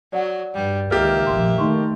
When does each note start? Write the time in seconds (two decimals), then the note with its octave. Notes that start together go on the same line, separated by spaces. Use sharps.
0.13 F#3 D5 F#5
0.54 G2 G3
0.91 C#2 D#3 A#3 G4 E5 F6 A6
1.27 F1 A#1 C6
1.58 D#3 A3 D#4 C6 C#6